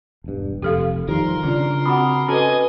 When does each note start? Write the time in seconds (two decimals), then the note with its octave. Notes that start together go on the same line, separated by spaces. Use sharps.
0.24 E1 G2
0.62 F1 G4 A4 F5
1.08 D#3 F3 G3 A#4 C6
1.44 C#3 D4 F4 D5
1.85 C4 F#4 F#5 B5 D#6
2.28 C#4 F#4 A4 B4 D#5 G#5 A5